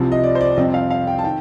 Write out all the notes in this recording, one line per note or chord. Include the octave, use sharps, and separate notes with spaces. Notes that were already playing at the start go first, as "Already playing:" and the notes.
Already playing: C2 C3 F3 C4
D#5
D5
C5
D5
F2 C3 G3 C4 D#5
F5
F5
G5
A5
D#3 G5